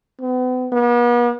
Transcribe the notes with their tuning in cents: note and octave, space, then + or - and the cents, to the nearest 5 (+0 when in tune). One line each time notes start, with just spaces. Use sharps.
B3 +40
B3 -45